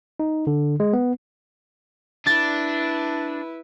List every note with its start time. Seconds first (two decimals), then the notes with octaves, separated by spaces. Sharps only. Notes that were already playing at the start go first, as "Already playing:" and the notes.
0.20 D#4
0.47 D3
0.80 G#3
0.93 B3
2.27 D4 E4 B4 A6